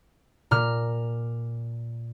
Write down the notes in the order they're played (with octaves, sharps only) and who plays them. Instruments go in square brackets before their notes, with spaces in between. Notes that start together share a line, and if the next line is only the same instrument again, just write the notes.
[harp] A#2 A#5 F6